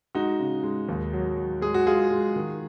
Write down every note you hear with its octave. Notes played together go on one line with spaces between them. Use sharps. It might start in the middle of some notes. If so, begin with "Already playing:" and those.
G#3 D#4 F#4
C#3
G#3
D#2
F#3
F#3
G#3 G#4
F#4
G#3 F4 G#4
G#3
D#3